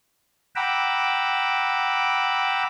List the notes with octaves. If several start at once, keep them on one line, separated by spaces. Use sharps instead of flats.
F#5 G5 A#5 B5 D6 E6